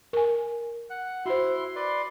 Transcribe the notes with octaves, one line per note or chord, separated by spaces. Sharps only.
A#4 G#5
F#5
E4 F#4 C5 C6
B4 D5 C6